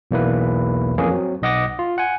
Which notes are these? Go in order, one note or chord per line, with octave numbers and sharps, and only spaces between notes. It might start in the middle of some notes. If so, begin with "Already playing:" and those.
B1 E2 B2 A#3 E4 B4
F2 E3 A#3 C#4 G#4
F#3 C4
B1 D#5 F#5 D6 A#6
F4
F#5 G#5